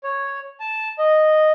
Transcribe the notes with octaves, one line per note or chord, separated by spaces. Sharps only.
C#5
A5
D#5